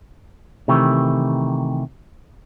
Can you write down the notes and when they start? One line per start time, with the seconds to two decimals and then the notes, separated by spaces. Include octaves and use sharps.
0.68 C3 D#3 E3 A3